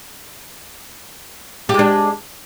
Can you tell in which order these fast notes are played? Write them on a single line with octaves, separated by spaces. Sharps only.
G4 G#3 D4